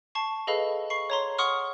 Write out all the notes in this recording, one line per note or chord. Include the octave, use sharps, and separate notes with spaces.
A5 C#6 C7
G#4 A4 B4 D#5 F5 B5
B5 C#6 C7
C#5 A#5 C6
F#5 C6 C#6 D#6 F6